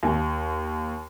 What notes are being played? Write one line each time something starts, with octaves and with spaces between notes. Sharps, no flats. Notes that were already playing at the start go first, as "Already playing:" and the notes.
D#2